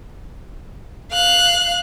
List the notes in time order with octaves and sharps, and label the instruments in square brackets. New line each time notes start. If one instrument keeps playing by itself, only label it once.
[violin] F5 F#6